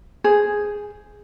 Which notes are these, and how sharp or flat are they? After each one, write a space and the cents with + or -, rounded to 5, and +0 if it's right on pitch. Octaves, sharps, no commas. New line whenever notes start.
G#4 +0 C5 +0